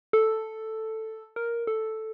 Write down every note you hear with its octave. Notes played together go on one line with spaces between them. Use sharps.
A4
A#4
A4